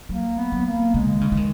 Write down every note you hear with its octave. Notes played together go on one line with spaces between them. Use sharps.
F#3 A#3
B3
F#3
A#3
C#3 G#3
D#3
C#3
E3
D#3